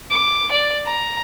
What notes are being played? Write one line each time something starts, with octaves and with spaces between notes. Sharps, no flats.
D6
D5
A#5